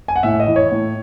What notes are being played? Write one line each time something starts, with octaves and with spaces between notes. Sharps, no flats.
G#5
F#5
A2 E5
D#5
E3
C#5
A2